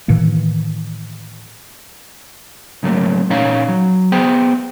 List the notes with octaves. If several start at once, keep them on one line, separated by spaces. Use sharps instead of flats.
A2 D#3 E3 A#3
G#2 C#3 F#3 A3 A#3
A#2 C#4 D#4 C#5 F5
F#3
B3 G#4 C5 G5